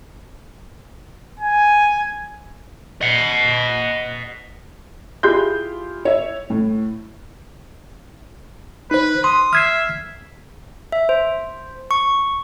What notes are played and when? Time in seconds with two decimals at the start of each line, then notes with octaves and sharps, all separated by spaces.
1.40 G#5
3.01 D#5 F#5
5.23 E4 F4 G4 G#4 C6 G6
6.05 C#5 E5
6.50 A2
8.91 D#4 B4 C5
9.24 C6 D#6
9.53 E5 F6 G#6 C7
10.92 E5
11.09 C5
11.91 C#6